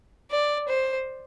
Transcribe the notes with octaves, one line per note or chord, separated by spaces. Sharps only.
D5
C5